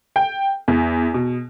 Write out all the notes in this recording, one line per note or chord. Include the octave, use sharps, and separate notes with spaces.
G5
E2
B2